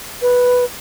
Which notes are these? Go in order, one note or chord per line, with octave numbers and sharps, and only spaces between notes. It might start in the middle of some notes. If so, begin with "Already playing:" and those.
B4